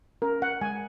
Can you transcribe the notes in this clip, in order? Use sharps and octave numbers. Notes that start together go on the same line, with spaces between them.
C#4 A#4
F#5
G#3 G#5